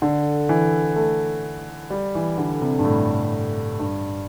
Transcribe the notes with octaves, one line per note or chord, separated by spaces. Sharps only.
D3
E3
A3
G3
E3
D3
C3
G2
A2
G2